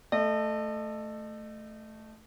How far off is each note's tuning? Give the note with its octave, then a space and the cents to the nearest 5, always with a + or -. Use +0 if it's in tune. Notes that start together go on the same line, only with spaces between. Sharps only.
A3 +0 D#5 -35